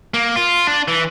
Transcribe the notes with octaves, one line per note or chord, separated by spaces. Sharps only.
A#3
F4
D4
E3